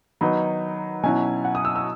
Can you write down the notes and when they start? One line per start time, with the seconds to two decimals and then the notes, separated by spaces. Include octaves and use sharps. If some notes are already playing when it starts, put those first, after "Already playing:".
0.21 D#3 F#3 B3 D#4 B5
1.03 B2 F#3 C#4 E4 G#5
1.45 F#5
1.55 D#6
1.65 E6
1.76 E6